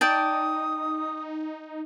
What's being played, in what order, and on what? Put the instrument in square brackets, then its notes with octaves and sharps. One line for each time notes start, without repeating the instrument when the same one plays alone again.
[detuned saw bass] D#4 [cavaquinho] D5 G5 A5 [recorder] D#6